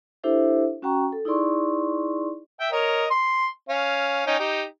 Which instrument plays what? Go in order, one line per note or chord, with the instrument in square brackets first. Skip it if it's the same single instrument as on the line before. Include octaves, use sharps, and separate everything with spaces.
[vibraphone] D4 E4 G4 A4 C5 E5
C#4 F#4 F#5 G5 A#5 C#6
A4
D#4 E4 G#4 D5 C6 C#6
[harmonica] E5 G5
A#4 C#5 D#5
C6
C#4 F5
C#4 D#4 G5
D#4 G4